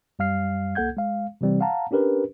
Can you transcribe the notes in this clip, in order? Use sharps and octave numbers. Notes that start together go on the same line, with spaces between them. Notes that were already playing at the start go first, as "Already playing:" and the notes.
F#2 G3 F5 F6 C7
C2 A#3 A4 F#5 G6 G#6
G#3 F5
C3 E3 G3 C4
F5 F#5 A5 A#5
C#4 D4 G4 A#4 B4